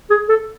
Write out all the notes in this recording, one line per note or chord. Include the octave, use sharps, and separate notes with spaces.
G#4
A4